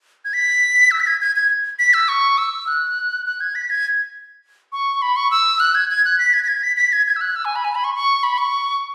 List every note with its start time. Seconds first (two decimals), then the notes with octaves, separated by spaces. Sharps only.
0.25 G#6
0.33 B6
0.91 E6
1.00 B6
1.07 G#6
1.21 G#6
1.36 G#6
1.79 B6
1.94 E6
2.08 C#6
2.38 E6
2.68 F#6
3.26 F#6
3.40 G#6
3.55 B6
3.70 G#6
4.72 C#6
5.02 B5
5.16 C#6
5.31 E6
5.60 F#6
5.75 G#6
5.90 G#6
6.05 F#6
6.19 B6
6.34 G#6
6.43 B6
6.48 G#6
6.63 B6
6.77 B6
6.93 G#6
7.07 G#6
7.16 E6
7.21 F#6
7.36 E6
7.45 G#5
7.56 B5
7.65 G#5
7.75 B5
7.84 C#6
7.95 C#6
8.23 B5
8.38 C#6